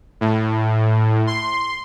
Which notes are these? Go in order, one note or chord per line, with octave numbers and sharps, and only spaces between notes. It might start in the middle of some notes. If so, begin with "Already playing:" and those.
A2
C6